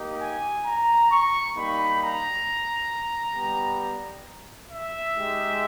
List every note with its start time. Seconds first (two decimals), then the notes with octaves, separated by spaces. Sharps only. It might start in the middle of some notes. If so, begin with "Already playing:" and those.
Already playing: A#3 D#4 G4
0.21 G#5
0.66 A#5
1.11 C#6
1.56 G3 A#3 D#4 G4 B5
2.01 A#5
3.35 G3 B3 G4
4.70 E5
5.14 G#3 D#4 G4